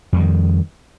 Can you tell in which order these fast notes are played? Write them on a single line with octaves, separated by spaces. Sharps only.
F2 G3 D#3